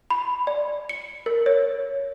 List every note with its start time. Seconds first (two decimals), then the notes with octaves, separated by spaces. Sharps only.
0.10 B5
0.47 D5
0.89 C#7
1.26 A#4
1.46 C#5